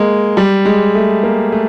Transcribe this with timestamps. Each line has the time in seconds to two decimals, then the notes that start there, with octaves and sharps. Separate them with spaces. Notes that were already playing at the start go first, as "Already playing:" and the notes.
Already playing: G#3 A#3
0.37 G3
0.65 G#3
0.95 A3
1.23 A#3
1.52 A3